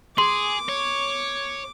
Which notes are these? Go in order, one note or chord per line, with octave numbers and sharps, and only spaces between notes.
G#4 C6 D6
C#5